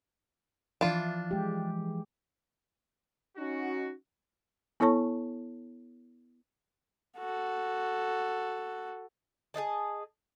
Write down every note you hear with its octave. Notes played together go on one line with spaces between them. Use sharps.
E3 F3 D4 F4
G#3 G4
C#4 D#4 F#4
B3 E4 A4 C#5 A5 C#6
F#4 A4
G#4 C5 D#5 A5